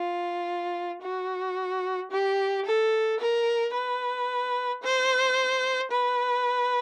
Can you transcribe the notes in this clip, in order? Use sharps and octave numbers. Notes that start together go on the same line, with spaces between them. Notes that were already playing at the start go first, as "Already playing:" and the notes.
Already playing: F4
F#4
G4
A4
A#4
B4
C5
B4